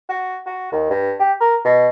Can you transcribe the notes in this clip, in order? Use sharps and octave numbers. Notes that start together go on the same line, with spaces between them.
F#4
F#4
D#2
G2
G4
A#4
B2